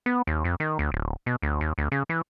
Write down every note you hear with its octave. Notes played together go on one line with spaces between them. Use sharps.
B3
D#2
F2
D#3
D2
D1
B2
D2
D#2
D2
C#3
E3